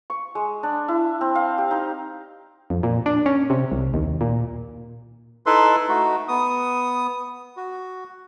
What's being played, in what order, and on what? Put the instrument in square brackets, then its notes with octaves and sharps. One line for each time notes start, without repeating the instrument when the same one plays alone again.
[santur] C#6
G#3
D4
E4
C4
F5
G4
D#4
[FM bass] F2
A#2
D4
C#4
C3
C2
D#2
A#2
[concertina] D#4 E4 A4 B4 E5 C6
A3 D#4 F#4
B3 D#6
F#4